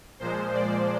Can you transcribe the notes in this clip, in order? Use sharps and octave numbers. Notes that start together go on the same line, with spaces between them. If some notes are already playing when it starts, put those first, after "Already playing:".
A#2 F3 G#3 C5
D5